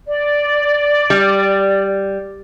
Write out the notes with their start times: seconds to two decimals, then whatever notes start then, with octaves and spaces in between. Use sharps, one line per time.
0.08 D5
1.10 G3